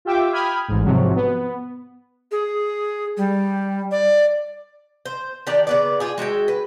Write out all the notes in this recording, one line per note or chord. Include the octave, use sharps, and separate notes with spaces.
F4 G4 E5 G5 D6
G5 B5 D#6 F6 G#6
A1 G#2
G#2 C3 F3 F#3
B3
G#4
G3
D5
C5
D#3 D4 G4 D5
C#3 B3 D5
F4 G4 G#4
G#3 F#4 E5 G5
B4